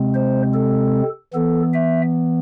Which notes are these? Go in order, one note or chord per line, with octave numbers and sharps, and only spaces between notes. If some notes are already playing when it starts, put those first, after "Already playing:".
Already playing: C3 G#3 C4
C5
A4
E3 B3 A4
E5